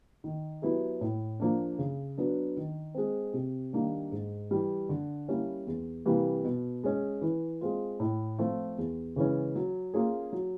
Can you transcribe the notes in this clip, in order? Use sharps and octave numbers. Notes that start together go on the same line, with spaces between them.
D#3
F#3 B3 E4 G4
A2
F3 A#3 D4
C#3
F#3 B3 D4
D#3
G#3 C4
C3
D#3 G3 A#3 D4
G#2
E3 G3
D3
G3 A#3 C#4 E4
E2
C3 E3 G3 A#3
B2
G#3 C#4
E3
G#3 C4 F4
A2
F3 A3 C4 F4
E2
C#3 E3 G#3 C#4
F#3
A#3 C#4 F4 G#4
F#3